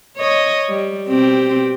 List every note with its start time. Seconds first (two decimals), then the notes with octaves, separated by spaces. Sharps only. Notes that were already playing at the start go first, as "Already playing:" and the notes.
0.17 C#5 D#5
0.69 G3
1.08 B2 C4 G4